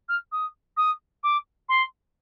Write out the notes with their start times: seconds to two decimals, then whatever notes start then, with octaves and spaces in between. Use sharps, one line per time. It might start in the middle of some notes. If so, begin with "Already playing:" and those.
0.09 F6
0.32 D#6
0.77 D#6
1.23 D6
1.69 C6